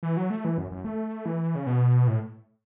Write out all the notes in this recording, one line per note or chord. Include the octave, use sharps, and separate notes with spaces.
E3
F#3
A3
E3
F#2
F#2
A3
E3
C#3
B2
A2